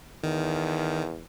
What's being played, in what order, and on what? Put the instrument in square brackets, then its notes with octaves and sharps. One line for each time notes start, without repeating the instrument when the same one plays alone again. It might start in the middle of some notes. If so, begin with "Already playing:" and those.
[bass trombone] E2 [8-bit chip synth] D#3